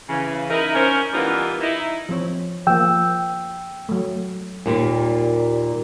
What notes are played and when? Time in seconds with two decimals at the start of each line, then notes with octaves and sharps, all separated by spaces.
0.09 C#3 E3
0.49 D#4 E4 A#4
0.75 C#4 A#4 C5
1.13 E3 G3 A#3 B3 D#4 F4
1.61 D#4 E4
2.09 F3 C4 C#5
2.67 F3 A#3 G5 E6
3.89 F#3 A3
4.66 D#2 A#2 G3